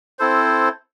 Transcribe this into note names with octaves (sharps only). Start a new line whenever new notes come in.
C4 E4 A4 C5